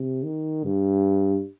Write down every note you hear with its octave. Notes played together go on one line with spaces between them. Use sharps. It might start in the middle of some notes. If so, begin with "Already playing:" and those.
Already playing: C3
D#3
G2